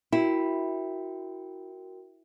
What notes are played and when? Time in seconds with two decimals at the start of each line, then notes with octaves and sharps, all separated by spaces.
0.12 E4 F#4 A#4 G5